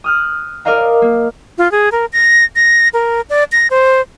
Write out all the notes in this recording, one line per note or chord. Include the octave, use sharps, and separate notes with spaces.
D#6 F6 F#6
A#4 D5 D#5 F5 A#5
A#3
F4
G#4
A#4
A#6
A#6
A#4
D5
A#6
C5